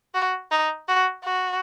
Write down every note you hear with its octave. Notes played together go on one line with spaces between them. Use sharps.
F#4
D#4
F#4
F#4